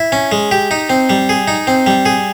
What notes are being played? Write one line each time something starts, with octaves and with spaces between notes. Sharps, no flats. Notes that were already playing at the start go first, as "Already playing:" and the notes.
Already playing: E4
C#4
G#3
G4
D#4
C4
G3
G#4
D#4
C4
G3
G#4